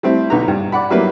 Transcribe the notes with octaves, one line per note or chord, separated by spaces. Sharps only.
G3 A3 C4 E4
B1 D3 B3 D#4 A#5
G2
D5 F#5 B5
F#3 G3 A#3 B3 E4 B4